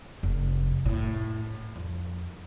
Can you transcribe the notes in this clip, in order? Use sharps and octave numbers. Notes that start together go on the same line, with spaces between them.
F1
A2
F2